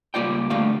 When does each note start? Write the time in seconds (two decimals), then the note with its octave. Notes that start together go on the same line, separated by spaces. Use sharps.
0.14 C#2 G3 A#3 F4 D5 G5
0.50 D2 D3 G3 A3 F5